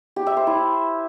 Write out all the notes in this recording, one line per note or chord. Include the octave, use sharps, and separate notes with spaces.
G4
E5
C5
E4